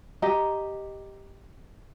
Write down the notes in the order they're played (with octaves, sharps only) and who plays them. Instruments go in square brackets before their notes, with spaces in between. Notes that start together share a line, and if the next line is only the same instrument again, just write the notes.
[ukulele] G4 D#5 A#5